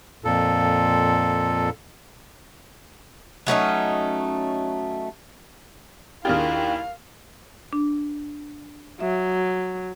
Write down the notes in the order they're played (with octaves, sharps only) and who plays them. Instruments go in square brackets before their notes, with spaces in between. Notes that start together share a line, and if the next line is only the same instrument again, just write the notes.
[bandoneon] F2 A#2 A4
[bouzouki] F#3 A3 C#4 D#4
[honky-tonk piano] D#2 D4 G4 [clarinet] E4 [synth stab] F4 G#4 A#4 [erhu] F5
[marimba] D4
[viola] F#3 [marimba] E5